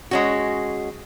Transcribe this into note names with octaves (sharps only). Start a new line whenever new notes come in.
G#3 C#4 F#4